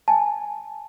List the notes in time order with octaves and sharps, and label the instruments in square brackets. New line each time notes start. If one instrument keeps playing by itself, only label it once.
[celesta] G#5 A5